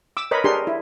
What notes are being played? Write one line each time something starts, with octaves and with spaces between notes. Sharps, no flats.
D6 E6
A#4 B4 C#5 D#5 B5
D4 G4 G#4 A#4 C6
E4